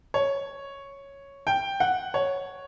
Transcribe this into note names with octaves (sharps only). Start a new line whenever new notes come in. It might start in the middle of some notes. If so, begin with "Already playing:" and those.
C#5
G5
F#5
C#5